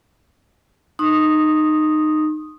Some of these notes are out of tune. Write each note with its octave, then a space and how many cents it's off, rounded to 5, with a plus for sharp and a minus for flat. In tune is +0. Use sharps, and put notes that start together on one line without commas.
D#4 -20 C6 +40 D#6 -5